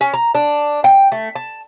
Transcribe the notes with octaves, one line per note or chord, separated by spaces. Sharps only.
C#4
A#5
D4
G5
A3
A5